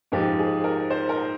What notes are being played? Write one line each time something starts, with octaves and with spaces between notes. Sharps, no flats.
G#2 F3 G#3 G4
G#4
A#4
C5
A#4